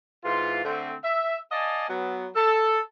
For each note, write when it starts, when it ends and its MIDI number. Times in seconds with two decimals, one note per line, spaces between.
0.24 0.64 44
0.24 0.64 52
0.24 0.64 65
0.64 0.94 50
0.64 0.94 57
0.64 0.94 60
1.04 1.37 76
1.52 1.87 74
1.52 1.87 75
1.52 1.87 77
1.52 1.87 80
1.52 1.87 81
1.88 2.27 54
1.88 2.27 59
2.36 2.80 69